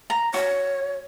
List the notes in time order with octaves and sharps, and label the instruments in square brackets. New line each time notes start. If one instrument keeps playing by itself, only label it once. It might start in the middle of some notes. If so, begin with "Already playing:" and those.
[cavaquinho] A#5
[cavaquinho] F#4 [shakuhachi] C#5